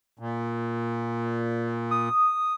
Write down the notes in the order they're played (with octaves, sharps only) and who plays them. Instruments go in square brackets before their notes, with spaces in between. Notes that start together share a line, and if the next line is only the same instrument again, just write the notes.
[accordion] A#2
[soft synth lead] D#6